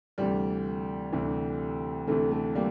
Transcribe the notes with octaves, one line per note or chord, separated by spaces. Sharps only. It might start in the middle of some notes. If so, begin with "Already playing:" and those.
D2 C3 E3 G3
D2 C3 E3
D2 C3 E3 A3
A3
G3 A#3